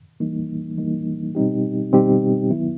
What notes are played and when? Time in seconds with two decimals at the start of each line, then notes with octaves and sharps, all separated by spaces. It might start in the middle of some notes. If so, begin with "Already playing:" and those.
0.20 E3 G3 A#3 D#4
0.78 E3 G3 A#3 D#4
1.35 B2 G3 C4 D#4 G4
1.93 B2 G3 C4 D#4 G4
2.50 D#3 F#3 B3 E4